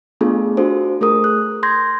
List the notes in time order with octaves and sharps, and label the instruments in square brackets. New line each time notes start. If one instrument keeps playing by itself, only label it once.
[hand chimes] A3 B3 D4 F4 G#4 A4
D4 F4 F#4 A4 C5
A3 G#4 A#4 D#6
F#6
C6 G6 G#6 A#6